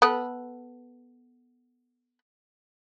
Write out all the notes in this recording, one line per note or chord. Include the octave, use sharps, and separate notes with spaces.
B3 A4 B4